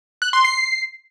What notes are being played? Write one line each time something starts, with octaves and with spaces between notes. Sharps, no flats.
F#6
C6
C7